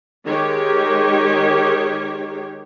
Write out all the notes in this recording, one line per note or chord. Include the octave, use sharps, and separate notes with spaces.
D#3 G#3 G4 C#5